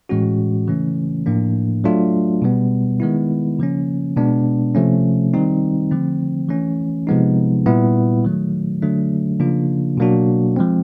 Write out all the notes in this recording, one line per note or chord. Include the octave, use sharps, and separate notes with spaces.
A2 E3 G#3 C#4 F#4
C#3 E3 A3 C#4
A2 F3 A#3 D4
F#3 A3 D4 F4
B2 G3 B3
D#3 G#3 B3 E4
C#3 F3 A#3 C#4
B2 G#3 B3 D4
C3 F3 A3 C#4
D#3 G3 C4 D#4
D3 F3 A3 C4
E3 A3 C#4
C3 F3 G#3 B3 D#4
A#2 G3 B3 E4
D#3 F#3 A3
D3 F#3 A3 D4
C#3 F3 A#3 D4 F4
B2 F#3 A#3 D4 F#4
F3 G#3 C4